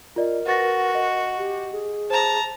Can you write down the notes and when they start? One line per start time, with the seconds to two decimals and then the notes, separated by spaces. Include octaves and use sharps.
0.16 F4 A#4 D5 D#5
0.46 F#4 B4 A6 A#6
0.95 D#5
1.38 G4
1.72 G#4
2.10 C5 A5 A#5